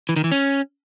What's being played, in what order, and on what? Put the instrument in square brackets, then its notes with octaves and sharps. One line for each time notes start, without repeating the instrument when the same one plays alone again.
[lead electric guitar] E3
D#3
E3
C#4